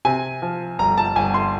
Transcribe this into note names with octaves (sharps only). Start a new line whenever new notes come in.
C3 G#5
F3
G1 A#5
A5
G1 G#5
C6